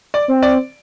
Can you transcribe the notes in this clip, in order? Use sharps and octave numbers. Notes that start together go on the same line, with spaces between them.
D5
C4
D5